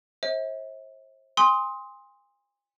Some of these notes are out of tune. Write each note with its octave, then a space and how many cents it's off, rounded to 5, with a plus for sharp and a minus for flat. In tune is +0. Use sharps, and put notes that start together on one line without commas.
C5 +40 E5 -40
G#5 -35 C6 +5 D#6 +25